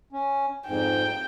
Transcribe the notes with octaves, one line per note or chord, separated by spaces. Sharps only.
C#4
F2 G#2 G5